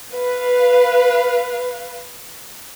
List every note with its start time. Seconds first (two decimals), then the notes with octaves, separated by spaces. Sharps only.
0.14 B4 F5